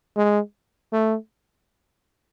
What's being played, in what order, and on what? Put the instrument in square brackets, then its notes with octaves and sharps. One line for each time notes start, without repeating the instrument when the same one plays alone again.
[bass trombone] G#3
A3